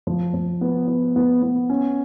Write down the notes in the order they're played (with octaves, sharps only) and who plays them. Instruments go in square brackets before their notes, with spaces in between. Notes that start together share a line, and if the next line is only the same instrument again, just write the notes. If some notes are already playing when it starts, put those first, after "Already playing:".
[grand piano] F3
F3
B3
B3
B3
B3
C#4